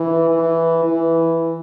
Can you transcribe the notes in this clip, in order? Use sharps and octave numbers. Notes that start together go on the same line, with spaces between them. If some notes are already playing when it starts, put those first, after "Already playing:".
Already playing: E3
E3
E3